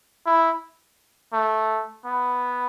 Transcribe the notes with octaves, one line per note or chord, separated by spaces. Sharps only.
E4
A3
B3